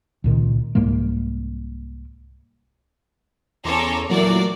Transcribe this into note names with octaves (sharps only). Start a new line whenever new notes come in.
C#2 A#2 D#3
C2 G#2 G#3 A#3
E2 C#4 A4 C#5 A#5 C6 D6
A#2 E3 F#3 A3 A#3 F#4 D5